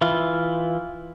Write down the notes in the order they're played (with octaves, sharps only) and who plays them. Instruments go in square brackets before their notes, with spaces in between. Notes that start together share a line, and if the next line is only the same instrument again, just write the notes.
[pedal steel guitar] E3 E4 F4